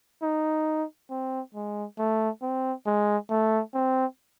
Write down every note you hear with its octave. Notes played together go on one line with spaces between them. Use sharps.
D#4
C4
G#3
A3
C4
G#3
A3
C4